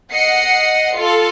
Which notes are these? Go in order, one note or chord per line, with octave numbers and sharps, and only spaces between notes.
D#5 F#5 C7 C#7
F4 A4